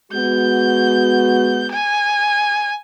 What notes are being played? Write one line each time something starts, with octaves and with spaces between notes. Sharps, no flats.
G#3 B3 F#4 G6
G#5